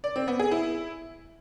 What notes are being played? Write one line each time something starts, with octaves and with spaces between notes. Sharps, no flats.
D5
C4
B3
G#4
E4